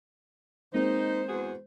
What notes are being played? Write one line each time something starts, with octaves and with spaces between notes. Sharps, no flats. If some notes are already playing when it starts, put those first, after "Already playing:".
G#3 A#3 C4 D#4 C5
E2 F#4 G#4